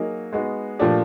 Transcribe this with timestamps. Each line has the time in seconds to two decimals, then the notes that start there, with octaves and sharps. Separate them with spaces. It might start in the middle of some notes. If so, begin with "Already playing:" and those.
Already playing: F#3 A#3 D#4 G#4
0.33 G#3 B3 D#4 F#4
0.79 A#2 F3 A3 D4 G4